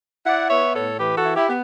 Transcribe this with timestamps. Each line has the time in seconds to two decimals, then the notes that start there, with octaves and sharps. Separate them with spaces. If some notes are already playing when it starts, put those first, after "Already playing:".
0.25 E4 D5 F#5
0.49 B3 C#5 E5
0.74 A2 A4 C#5
0.98 E3 G4 B4
1.17 F#4 A4
1.23 E4
1.36 E4 G4
1.48 B3